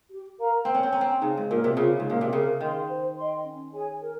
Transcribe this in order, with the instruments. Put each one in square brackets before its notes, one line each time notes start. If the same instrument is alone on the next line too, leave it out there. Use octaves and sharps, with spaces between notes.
[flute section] G4
A#4 F5 A#5
[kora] C4 [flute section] C5
[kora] C#4
C4
[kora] C#4 [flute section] G5 A#5
[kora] C4
[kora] C#3 [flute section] D#4
[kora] G#2
[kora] A#2 [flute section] A#4 C#5
[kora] C3
[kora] C#3 [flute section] F4
[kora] G#2
[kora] A#2 [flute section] A#4 F5
[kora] C3
[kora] C#3 [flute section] A#4
[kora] D#3 [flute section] F5 C6
[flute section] C5
D#5 G5 C6
C#4
G#4 C#5 G#5
A#4